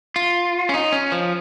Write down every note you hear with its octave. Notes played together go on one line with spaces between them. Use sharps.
F4
C#4
D#4
C#4
F3